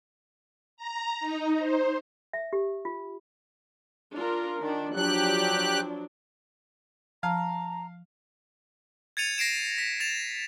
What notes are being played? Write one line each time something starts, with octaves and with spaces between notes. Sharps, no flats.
A#5
D#4
C5
E5
G4
F4
D4 F4 A#4
D#3 D4
F3 F#3 D4 G4 F#6
F3 F5 A5 A#5
G#6 A6 C#7 D#7 F7
A#6 C7 D7 E7
B6
A6 E7 F7